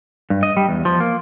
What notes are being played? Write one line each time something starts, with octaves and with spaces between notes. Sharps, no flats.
G2
D#5
G3
E2
F3
A#3